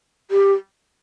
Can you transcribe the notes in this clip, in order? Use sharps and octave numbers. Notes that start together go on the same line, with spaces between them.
G4